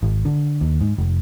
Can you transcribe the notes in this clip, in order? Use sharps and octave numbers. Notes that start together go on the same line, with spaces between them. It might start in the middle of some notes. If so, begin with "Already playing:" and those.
G#1
D3
D#2
G#2
F1